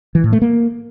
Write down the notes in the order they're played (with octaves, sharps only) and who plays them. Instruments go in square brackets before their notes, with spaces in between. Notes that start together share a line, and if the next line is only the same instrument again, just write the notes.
[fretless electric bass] E3
A2
A3
A#3